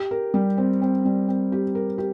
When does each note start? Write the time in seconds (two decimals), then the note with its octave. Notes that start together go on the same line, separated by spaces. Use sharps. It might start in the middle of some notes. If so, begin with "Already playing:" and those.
Already playing: G4
0.11 A#4
0.34 G3
0.57 C4
0.82 C4
1.05 G3
1.28 C4
1.52 G4
1.75 A#4
1.98 G4